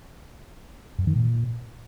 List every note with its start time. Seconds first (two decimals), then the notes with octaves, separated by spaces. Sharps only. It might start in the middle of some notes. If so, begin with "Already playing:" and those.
0.99 F#2
1.07 D#3
1.16 A#2